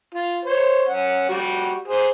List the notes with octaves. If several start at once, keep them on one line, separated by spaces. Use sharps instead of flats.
F4
C5 C#5
C#4 F#5
G3 F#4
G#4 C5